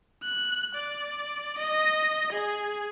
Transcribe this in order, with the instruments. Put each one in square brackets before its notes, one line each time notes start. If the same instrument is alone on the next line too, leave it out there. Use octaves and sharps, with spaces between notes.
[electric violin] F#6
D5
D#5
G#4